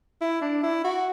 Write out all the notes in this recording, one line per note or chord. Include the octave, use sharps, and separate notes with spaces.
E4
D4
E4
F#4